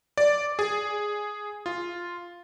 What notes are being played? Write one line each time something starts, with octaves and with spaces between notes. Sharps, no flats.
D5
G#4
F4